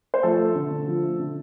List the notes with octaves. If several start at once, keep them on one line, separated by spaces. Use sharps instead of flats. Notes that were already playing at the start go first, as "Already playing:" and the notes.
C5
F3 A3 A4
A3
D3
D3
F3
A3
D3